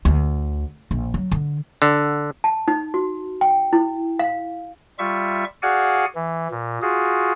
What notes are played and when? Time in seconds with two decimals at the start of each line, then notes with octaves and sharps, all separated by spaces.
0.05 D2
0.91 A#1
1.14 F#3
1.31 D3
1.82 D3
2.44 A5
2.68 D#4
2.94 F#4
3.41 G5
3.73 E4
4.19 F5
4.99 G3 F4 E5 C#6
5.63 F#4 G#4 D5 F5 F#5 G#5
6.15 E3
6.51 A#2
6.82 F4 F#4 G#4